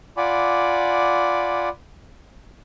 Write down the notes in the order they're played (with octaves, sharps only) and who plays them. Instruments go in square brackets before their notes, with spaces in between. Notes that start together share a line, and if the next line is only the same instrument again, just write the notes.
[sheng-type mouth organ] F4 D5 F#5 G#5 B5 D6